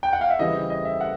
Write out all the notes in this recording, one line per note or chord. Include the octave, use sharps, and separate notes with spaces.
G5
F#5
F5
E5
C#3 E3 G3 C4 D#5
D#5
E5
F#5